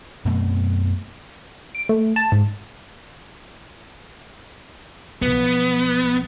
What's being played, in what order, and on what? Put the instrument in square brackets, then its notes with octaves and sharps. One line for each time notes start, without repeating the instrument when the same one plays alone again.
[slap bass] F#2 B2 A3 C4
[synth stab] D7
A3
A5
G#2
[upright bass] B1 F3 [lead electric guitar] B3